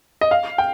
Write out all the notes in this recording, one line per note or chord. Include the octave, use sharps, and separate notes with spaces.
D#5
F5
G5